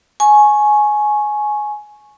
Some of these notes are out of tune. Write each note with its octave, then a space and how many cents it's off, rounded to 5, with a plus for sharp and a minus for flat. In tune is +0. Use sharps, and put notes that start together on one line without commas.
G#5 +15 C#6 -10